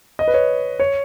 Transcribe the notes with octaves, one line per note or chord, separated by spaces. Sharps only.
D#5
B4
C#5
C#5